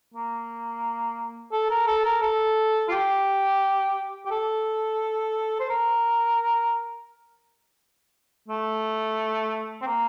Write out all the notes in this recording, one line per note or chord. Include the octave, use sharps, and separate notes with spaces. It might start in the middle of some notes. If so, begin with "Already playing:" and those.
A#3
A4
A#4
A4
A#4
A4
F4
G4
G4
A4
C5
A#4
A3
C4
A#3